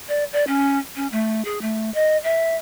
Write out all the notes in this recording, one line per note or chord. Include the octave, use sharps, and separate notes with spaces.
D5
D5
C#4
C#4
A3
G#4
A3
D#5
E5